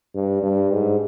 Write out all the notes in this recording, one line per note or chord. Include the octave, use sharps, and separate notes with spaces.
G2
G2
G#2